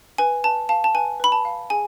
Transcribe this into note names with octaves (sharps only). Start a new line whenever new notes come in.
B4 G#5
B4 A5
F5 A5
A5
B4 G#5
B4 B5
A5
F5
G#4 G#5